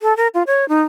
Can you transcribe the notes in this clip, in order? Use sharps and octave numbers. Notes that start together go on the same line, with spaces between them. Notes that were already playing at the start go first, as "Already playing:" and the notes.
A4
A#4
F4
C#5
D#4